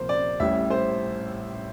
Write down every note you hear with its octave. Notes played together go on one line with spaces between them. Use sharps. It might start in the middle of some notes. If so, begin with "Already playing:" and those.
Already playing: C2 A#2 F3 A#3 C5
D5
A1 A2 G3 E5
C5